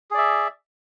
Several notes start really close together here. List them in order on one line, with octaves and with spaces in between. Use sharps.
G#4 D5 E5